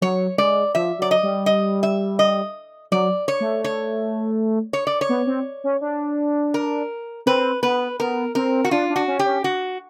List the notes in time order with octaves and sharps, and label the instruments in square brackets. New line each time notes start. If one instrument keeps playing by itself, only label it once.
[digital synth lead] F#3 [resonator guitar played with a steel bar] C#5
[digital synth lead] G#3 [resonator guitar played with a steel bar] D5
[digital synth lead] F3 [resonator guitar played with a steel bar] E5
[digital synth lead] F#3 [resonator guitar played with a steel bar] D5
[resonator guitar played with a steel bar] D#5
[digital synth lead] G3
[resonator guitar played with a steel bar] D#5
E5
D#5
[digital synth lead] F#3 [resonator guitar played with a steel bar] D5
[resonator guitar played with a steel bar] C#5
[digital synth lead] A3
[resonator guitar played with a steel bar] C#5
C#5
D5
C#5
[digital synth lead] B3
C4
C#4
D4
[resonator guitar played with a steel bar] A#4
[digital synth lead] C4 [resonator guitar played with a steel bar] B4
[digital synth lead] B3 [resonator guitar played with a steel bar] B4
[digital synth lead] B3 [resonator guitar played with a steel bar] A#4
[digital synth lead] C4 [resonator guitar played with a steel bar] A#4
[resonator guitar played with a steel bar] F#4
[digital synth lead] D4 [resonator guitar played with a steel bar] F4
[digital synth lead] D4
[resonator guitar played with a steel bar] F#4
[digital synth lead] C#4
[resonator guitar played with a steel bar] G4
[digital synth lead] C#4
[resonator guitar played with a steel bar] F#4